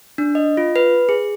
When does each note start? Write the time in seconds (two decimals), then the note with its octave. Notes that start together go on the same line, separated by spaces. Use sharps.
0.18 D4
0.35 D#5
0.57 F4
0.76 B4
1.09 G#4